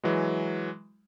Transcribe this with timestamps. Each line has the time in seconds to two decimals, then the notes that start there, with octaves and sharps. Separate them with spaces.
0.04 E3 F#3 G#3